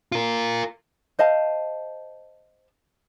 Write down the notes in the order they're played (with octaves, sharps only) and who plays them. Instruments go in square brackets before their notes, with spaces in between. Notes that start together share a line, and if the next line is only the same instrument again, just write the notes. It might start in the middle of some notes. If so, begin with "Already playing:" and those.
[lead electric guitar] F4 A#4
[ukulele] C5 D#5 F5 A5